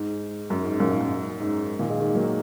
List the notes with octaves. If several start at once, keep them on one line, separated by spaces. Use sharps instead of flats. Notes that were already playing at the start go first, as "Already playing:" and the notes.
Already playing: G#2
F#2
G#2
F#2 A#2
G#2
F#2
G#2
A#2 D#3
D#3 G#3
D#3 G#3
F#3 A#3